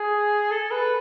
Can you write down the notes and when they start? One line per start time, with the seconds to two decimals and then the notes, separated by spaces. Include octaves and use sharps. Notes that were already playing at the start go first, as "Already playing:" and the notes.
Already playing: G#4
0.51 A4
0.71 B4